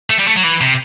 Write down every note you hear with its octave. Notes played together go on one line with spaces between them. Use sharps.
A3
G3
A3
F#3
E3
C3